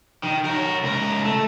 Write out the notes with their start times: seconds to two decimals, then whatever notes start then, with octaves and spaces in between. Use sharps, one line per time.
0.23 D#3
0.45 A#4 C#5
0.83 C#2 A#4
1.24 A3